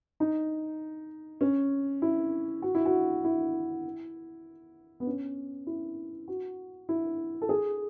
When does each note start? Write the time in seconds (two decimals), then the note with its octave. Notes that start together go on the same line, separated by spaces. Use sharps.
0.20 D#4
1.41 C#4
2.02 E4
2.62 F#4
2.75 E4
2.86 F#4
3.24 E4
5.00 B3
5.07 C#4
5.67 E4
6.28 F#4
6.89 E4
7.42 A4
7.49 G#4